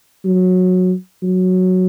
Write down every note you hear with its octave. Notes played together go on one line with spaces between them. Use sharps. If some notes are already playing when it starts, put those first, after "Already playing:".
F#3
F#3